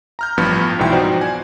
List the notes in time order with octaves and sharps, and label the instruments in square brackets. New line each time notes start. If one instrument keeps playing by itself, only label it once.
[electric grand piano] A#5 F6 G6
A1 G2 F3 B3
C2 G#2 B2 E3 G5
F3 B3 D#4 F#4 C5 D5
G#5